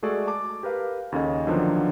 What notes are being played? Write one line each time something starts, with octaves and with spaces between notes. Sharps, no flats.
G#3 A3 F#4 G#4 A4 D5
A5 D6
G4 A#4 B4 F5
D#2 C#3 C#4 A4 D#5
D3 D#3 F3 F#3 B3 D4